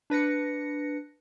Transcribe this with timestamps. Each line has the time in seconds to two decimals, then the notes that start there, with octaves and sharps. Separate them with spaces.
0.10 D4 B4 A#6 C#7